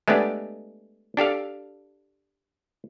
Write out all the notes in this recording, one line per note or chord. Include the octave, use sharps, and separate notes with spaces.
G#3 A3 B3 D4 G4
D4 G4 A4 F5